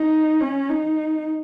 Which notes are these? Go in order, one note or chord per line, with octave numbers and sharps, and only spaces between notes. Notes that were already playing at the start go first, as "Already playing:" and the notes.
Already playing: D#4
C#4
D#4